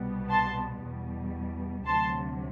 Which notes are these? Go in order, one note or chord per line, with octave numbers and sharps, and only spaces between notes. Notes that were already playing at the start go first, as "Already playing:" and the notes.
Already playing: C2 B2 G3 B3
A5 C6
E2 B2 G3
D2 C3 F#3 A5 C6